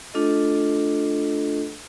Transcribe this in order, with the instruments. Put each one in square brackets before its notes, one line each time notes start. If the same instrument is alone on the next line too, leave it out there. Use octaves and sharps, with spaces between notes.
[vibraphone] A3 D4 F4 A4 D#5